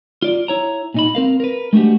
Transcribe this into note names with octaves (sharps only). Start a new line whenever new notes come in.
F4 D5
E4 C#5 A#5
A#2 D#4 B5
C4 A#4 F5
A#4 B4
G#3 A3 D4 F#4 G4